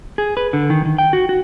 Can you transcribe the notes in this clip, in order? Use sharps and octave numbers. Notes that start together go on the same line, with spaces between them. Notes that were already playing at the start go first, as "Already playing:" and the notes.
G#4
B4
D3
D#3
D#3
G5
F#4
F#4